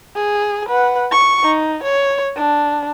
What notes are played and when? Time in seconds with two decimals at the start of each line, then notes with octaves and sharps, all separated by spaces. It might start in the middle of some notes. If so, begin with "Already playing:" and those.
0.16 G#4
0.69 B4 F#5
1.11 C#6
1.43 D#4
1.83 C#5
2.36 D4